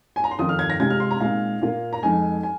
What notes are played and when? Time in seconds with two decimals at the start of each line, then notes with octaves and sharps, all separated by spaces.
0.16 G#5
0.24 A#5
0.31 C6
0.39 F2 D#3 C4 F4 D#6
0.49 F6
0.59 G#6
0.70 A#6
0.80 C3 G#3 C4 F4 G#6
0.90 F6
1.00 C6
1.11 A#5
1.21 A#2 G#3 C4 D#4 F5
1.62 A#2 A#3 F4
1.93 A#5
2.03 F2 F3 G#3 D#4 G#5
2.43 G#5